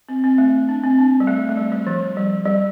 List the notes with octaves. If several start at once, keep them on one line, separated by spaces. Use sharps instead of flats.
C4
C4
A3
D4
C4
D4
G3
A3
A3
G3
G3
F3
G3
G3